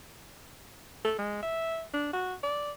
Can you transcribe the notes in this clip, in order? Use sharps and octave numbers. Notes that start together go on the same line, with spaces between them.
A4
G#3
E5
D4
F#4
D5